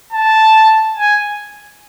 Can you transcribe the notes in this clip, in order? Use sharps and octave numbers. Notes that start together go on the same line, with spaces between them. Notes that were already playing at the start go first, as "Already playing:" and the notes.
A5
G#5